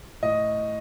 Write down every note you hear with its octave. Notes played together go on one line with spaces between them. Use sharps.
A2 D#5